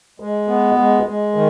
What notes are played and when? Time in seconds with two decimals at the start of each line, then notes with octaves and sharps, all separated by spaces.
0.20 G#3
0.48 B3
0.77 G#3
1.06 G#3
1.35 D#3